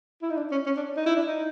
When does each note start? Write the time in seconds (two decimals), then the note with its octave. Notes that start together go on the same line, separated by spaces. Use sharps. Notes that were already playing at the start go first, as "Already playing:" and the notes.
0.22 E4
0.30 D#4
0.37 D4
0.52 C#4
0.66 C#4
0.77 D4
0.97 D#4
1.06 E4
1.16 D4
1.26 D#4